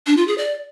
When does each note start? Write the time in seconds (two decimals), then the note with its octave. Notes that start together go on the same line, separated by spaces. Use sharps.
0.07 D4
0.17 F4
0.27 G#4
0.38 D5